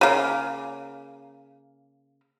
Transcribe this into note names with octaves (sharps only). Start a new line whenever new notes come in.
C#3 A#3